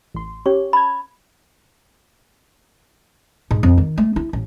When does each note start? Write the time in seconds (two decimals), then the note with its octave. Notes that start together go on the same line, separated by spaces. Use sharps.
0.14 A1 C6
0.46 C#4 G4 C#5 C#6
0.73 A5 B5 G#6
3.51 G#2
3.63 F2
3.78 D#3
3.98 A3
4.16 E4
4.33 A1